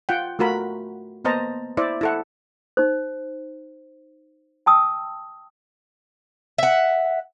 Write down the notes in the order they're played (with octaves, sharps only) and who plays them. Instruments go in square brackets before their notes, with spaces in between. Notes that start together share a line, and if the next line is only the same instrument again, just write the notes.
[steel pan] F4 F#5 G5
A3 F4 F#4 A#4 B5
A#3 B3 C5 D#5 A5 A#5
E4 C5 D5 E5
E4 A4 F#5
[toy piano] D#4 C5
G5 A5 D#6 E6
[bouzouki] E5 F#5